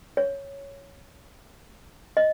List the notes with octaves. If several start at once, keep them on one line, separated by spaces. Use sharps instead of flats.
C#5
D#5